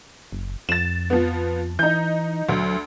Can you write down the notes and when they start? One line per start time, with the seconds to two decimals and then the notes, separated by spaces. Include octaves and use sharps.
0.32 F#1
0.69 F2 A6 E7
1.10 F3 B3
1.79 E3 D#4 G6
2.49 D2 F#3